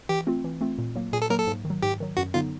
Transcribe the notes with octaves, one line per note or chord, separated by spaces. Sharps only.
E3 G4
A3 C4 F4
E3
A3 C4 F4
A#2
F#3 A#3
A#2 G#4
A4
F#3 A#3 A#4
A4
G#2
D#3
F#3
G#2 G4
D#3 F#3
F#2 F#4
D3 F#3 B3 D#4 F4